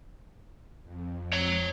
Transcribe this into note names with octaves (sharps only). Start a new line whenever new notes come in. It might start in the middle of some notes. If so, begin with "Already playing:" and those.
F2
C#5 A#5